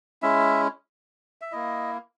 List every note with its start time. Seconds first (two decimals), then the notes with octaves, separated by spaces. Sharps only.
0.22 G#3 C#4 E4 E5
1.41 E5
1.52 A#3 E4 D#5